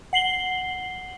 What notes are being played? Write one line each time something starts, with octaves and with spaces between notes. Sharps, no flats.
F#5 C7 F#7 G7